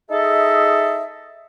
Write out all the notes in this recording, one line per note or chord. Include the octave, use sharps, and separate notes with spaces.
D#4 G#4 A4 D#5 E5